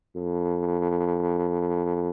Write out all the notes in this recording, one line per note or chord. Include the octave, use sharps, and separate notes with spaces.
F2